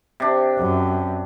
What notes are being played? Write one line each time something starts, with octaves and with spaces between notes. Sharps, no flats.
C3 D4
F#2